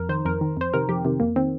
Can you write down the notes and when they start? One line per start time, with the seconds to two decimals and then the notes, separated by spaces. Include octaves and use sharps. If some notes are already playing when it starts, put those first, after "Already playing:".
Already playing: F2 A#4
0.09 D#3 C5
0.25 F2 A#4
0.41 D#3
0.57 F2 C5
0.74 C3 D#3 A#4
0.89 F2 G4
1.05 C3 D#3
1.20 F2 A#3
1.36 D#3 C4